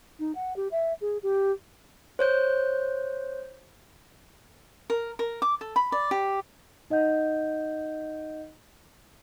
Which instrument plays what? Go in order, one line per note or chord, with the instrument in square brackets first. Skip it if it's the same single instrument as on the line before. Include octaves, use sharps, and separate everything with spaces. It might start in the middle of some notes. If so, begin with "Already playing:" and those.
[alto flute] D#4
F#5
G4
E5
G#4
G4
[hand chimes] C5 C#5 G6
[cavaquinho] A#4
A#4
D6
A4
B5
D5
G4
[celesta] D#4 D#5 F#5 G6